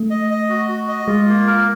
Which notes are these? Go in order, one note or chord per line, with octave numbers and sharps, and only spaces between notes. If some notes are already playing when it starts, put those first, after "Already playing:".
Already playing: A3
D#5
D#5
F#4
F#4
D#5
G#3 F4
A#3
A#4